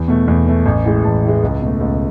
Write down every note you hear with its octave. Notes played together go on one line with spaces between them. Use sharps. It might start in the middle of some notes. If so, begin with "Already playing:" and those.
Already playing: E2
B2 A3
E2
B2 A3
A1
A2 E3 G#3
A1 A5
A2 E3 G#3
C#2
B2
A3
C#2